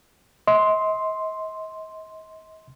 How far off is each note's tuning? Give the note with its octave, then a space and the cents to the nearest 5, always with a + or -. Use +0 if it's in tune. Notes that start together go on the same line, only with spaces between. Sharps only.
D#5 +40 C6 +0